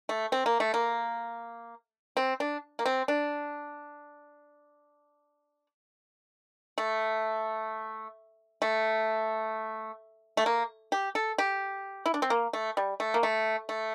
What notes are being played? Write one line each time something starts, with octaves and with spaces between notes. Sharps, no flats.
A3
C4
A#3
A3
A#3
C4
D4
A#3
C4
D4
A3
A3
A3
A#3
G4
A4
G4
E4
D4
C4
A#3
A3
G3
A3
A#3
A3
A3